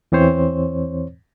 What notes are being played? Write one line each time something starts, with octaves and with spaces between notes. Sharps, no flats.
E2 E3 C4 C5 C#5